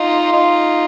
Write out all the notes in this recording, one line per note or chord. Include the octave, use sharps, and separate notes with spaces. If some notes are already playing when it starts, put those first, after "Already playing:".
Already playing: D#4 F4
D#4 F4